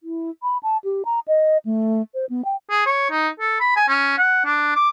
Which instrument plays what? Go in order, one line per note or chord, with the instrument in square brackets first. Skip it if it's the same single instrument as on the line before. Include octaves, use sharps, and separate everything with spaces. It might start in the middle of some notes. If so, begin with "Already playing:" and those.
[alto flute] E4
B5
A5
G4
A#5
D#5
A3
C5
B3
G5
[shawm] G#4
C#5
D#4
A4
B5
G#5
C#4
F#5
D4
D6